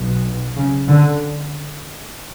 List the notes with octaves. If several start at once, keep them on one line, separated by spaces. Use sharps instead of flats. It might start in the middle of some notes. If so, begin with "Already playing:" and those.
Already playing: B1 B2
C#3
D3